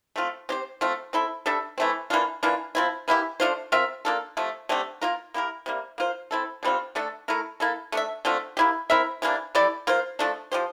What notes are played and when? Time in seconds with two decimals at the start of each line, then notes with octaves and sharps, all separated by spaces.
0.16 A3 C4 F4
0.49 C4 G4 C5
0.81 A3 C4 F4
1.13 C4 E4 A4 E5
1.46 G3 D4 A4 E5
1.78 E3 A3 C4
2.10 E3 A#3 D4 F4
2.43 E3 A#3 D4 F4
2.75 F3 C4 E4
3.08 E3 A#3 E4 G4
3.40 A3 D4 F4 C5
3.72 C4 F4 A#4 E5
4.05 A#3 D4 F4 A4
4.37 C3 F3 A3
4.69 D3 A3 C4 G4
5.02 A#3 F4 A#4
5.34 A#3 E4 G4 A#4
5.66 C3 G3 A#3
5.98 A#3 F4 C5
6.31 C4 E4 A4
6.63 D3 G3 C4 F4
6.95 D3 A3 D4 A4
7.28 A3 E4 A#4
7.60 A#3 E4 A4
7.92 A3 D4 A4 E5
8.25 D3 A3 C4 F4
8.57 A#3 E4 G4
8.90 C4 E4 A#4 E5
9.22 C3 E3 A#3 D4
9.55 A3 E4 G4 D5
9.87 A#3 F4 C5
10.19 F3 A3 D4 A4
10.52 F3 C4 G4 C5